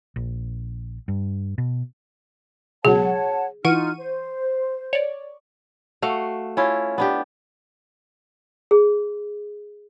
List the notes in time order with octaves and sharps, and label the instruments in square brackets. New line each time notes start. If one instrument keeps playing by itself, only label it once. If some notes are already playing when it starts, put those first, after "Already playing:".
[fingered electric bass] A#1
G2
B2
[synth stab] C#2 B2 F#3 [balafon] G#4 [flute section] C#5 F#5 A5
[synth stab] E3 C#6 D#7 [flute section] D#4 F4 F6 [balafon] F#5
[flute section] C5
[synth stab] C#5 D5
[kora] A3 F#4 F5
C#4 E4 F4
B3 D4 G4
[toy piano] G#4